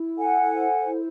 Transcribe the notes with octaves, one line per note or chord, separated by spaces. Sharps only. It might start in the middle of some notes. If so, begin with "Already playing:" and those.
Already playing: E4
A4 F#5 G#5
C5
E4